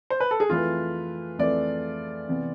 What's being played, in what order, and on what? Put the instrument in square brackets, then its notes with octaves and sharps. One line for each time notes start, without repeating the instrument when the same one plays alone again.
[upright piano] C5
B4
A4
G#4
[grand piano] F2 E3 A3 E4 B4 [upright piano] F4
[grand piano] F2 E3 A3 E4 B4 [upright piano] D5
[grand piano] C3 E3 B3